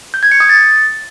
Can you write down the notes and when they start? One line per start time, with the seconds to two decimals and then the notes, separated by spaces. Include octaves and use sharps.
0.14 G6
0.23 G#6
0.32 C#7
0.40 D#6
0.49 A6